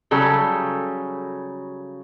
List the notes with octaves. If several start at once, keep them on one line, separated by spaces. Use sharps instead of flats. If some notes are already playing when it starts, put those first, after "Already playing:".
C#3 F#3 G3 A4